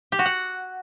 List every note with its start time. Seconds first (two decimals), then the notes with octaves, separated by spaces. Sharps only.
0.12 G4
0.19 F#4
0.26 F#5